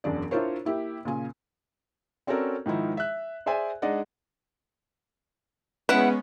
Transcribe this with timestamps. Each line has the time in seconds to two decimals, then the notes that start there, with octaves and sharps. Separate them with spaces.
0.04 E1 F#2 D4 D5
0.31 D4 E4 F4 A#4 C5 C#5
0.65 A#3 E4 G4
1.05 A#2 C#3 G#5
2.27 C4 C#4 F#4 A4 A#4 D5
2.66 G#2 D#3 F3 E4
2.97 E5 F#6
3.46 G#4 C5 D5 E5 G#5
3.82 G#3 D4 D#4 D5 D#5 F#5
5.89 G#3 B3 C#4 E4 B4 F#5